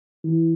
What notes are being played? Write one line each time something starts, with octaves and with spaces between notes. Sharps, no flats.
E3